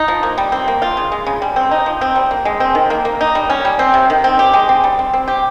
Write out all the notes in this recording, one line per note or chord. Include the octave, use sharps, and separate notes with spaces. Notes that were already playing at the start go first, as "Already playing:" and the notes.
Already playing: D#4
F3
A#3
G3
C4
A#3
F4
C#3
G#3
C#3
G3
C4
D#4
F3
C4
G3
A#3
G#3
C4
D#3
A#3
A#3
D#4
G3
C#4
G3
C4
C3
D#3
C4
G4
G#3
C4
G3
C4
C4
G4